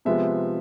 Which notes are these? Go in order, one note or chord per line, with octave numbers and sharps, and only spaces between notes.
C3 F3 G#3 B3 E5